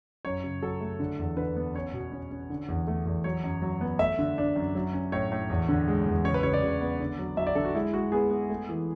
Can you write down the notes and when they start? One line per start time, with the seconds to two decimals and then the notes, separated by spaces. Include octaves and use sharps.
0.25 F#2 C#5
0.44 C#3
0.62 F#3 A4
0.81 A3
1.00 D3
1.18 E2
1.37 D3 B4
1.57 B3
1.75 C#4 C#5
1.94 B2
2.12 C#4
2.31 C#4
2.50 D3
2.68 E2
2.88 A3
3.06 E2
3.24 F#3 C#5
3.44 F#2
3.62 F#3
3.81 B3
3.99 A3 E5
4.19 D3
4.38 D4
4.56 F#2
4.75 F#3
4.93 C#4
5.12 A2 C#5
5.32 A2
5.50 E2
5.69 D3
5.88 G#3
6.06 E2
6.24 C#3 C#5
6.34 B4
6.43 C#3 C#5
6.54 D5
6.63 C#3
6.81 B3
7.00 D3
7.19 F#3
7.37 F#3 E5
7.47 D5
7.55 D3 A4
7.65 F#4
7.74 G#3 E4
7.93 G#3 F#4
8.12 B3 G#4
8.31 B3
8.50 A3
8.69 E3